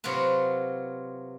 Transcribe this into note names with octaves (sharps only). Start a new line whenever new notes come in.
C3 F#3 F4 A#4 B4